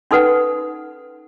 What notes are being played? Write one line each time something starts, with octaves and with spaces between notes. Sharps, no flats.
C#4 D#4 A4 B4 F#5